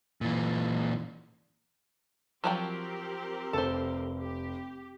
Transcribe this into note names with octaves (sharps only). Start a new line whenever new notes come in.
A#2 E3
F3 F#3 C4 G4 A#4 G5
F1 A4 C5
G4